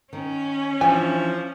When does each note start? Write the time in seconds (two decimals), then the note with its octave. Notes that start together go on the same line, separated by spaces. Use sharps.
0.13 D#3 C#4
0.81 E3 F3 D4 G#5